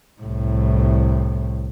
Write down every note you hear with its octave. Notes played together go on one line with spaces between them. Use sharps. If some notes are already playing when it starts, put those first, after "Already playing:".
C2 A2